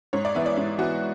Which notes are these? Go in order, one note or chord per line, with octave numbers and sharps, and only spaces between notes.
G#2 C#5
D5
E3 B3 E5
D5
G#2 E4
E3 B3 F#4